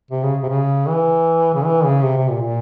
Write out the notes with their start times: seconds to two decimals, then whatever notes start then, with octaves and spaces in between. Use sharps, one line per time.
0.11 C3
0.23 C#3
0.43 C3
0.49 C#3
0.88 E3
1.54 C#3
1.65 E3
1.84 C#3
2.04 C3
2.17 C3
2.29 A#2
2.42 A#2